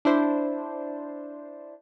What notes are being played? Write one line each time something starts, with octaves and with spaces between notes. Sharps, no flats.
D4 E4 C5